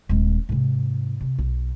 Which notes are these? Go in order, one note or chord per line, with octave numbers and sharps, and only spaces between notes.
D#1 G#3
G#2 C3
C3
B1